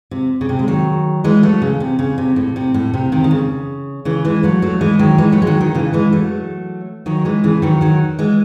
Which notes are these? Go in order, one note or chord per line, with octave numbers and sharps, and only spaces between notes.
C3
C#3
C3
G#3
D#3 F#3
E3 G#3
F#3 A3
C#3
C3
C#3
C3
A2
C3
A2
C3
C3 D#3
D#3
C#3
C#3 E3
E3 G#3
F#3 A3
F#3 A3
E3 G#3
D#3 F#3
E3 G#3
F#3 A3
G#3
D#3 F#3
D#3 F#3
C#3 E3
E3 G#3
F#3 A3
D#3 F#3
E3 G#3
C#3 E3
D#3 F#3
D#3 F#3
E3 G#3